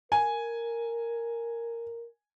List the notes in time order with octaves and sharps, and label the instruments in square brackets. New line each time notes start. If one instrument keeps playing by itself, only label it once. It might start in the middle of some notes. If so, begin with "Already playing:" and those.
[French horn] A#4 [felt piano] G#5